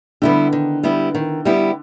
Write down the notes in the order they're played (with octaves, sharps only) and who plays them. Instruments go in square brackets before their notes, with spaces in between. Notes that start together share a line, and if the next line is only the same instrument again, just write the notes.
[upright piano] D3 [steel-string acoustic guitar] G3 B3 E4 G4
[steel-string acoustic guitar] D#3
G3 B3 E4 G4
D#3
G3 B3 E4 G4